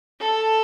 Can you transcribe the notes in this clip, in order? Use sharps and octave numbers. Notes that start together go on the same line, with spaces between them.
A4